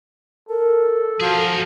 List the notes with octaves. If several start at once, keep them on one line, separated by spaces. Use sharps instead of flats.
A4 A#4
F3 F#4 G#4 A#4